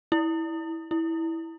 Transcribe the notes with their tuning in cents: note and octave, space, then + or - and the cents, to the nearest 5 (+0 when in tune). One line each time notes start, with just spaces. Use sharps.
E4 -15
E4 -10